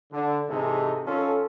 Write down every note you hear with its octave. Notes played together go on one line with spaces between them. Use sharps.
D3
G#2 C3 E3 D#4 G#4 A4
D#3 C#4 F4 A4